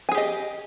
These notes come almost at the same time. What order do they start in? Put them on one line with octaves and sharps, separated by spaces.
G#5 G#4 G4 D#5